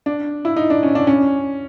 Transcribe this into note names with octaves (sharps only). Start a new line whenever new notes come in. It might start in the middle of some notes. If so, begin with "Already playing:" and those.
D4
E4
D#4
D4
C#4
D4
C#4